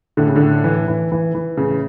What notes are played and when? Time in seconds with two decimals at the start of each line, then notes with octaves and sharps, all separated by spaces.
0.17 A2 D3
0.27 C#3
0.36 D3
0.41 A2
0.64 E3
0.88 E3
1.12 E3
1.35 E3
1.57 A2 C#3